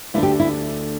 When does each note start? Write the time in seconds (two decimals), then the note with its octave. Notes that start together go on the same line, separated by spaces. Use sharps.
0.14 D2 D3 A3 D4 E4
0.23 G4
0.40 E4